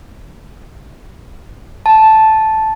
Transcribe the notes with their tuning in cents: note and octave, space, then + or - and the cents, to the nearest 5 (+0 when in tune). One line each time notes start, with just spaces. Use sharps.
A5 -5